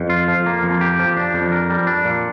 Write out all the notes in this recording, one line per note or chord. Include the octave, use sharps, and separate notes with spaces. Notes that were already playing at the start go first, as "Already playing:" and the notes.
Already playing: F2
F4
F3
A#3
F2
G4
F3
D4
F2
A#4
G3
D4
A#2